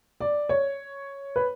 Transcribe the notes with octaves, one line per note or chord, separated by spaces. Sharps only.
D5
C#5
B4